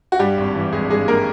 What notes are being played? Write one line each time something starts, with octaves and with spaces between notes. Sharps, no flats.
F#4
G2 G3 G4
G#1
E3
G#1 G#3 G#4
G2 G#3 G#4
A#3 A#4